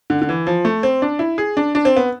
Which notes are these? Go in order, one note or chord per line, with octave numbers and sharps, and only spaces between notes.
D3
D3
E3
F3
A3
C4
D4
E4
G#4
D4
D4
C4
B3